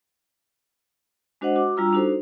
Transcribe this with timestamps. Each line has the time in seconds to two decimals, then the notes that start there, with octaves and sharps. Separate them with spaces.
1.41 G#3 D4 F#4 C5 D#5 F#5
1.55 F#4 D6
1.77 G3 D4 F4 A#5 E6
1.93 D4 D#4 F#4 A4 C5